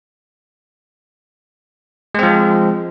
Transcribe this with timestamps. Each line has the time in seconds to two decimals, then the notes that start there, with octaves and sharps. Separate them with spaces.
2.15 G#3
2.19 C4
2.23 F3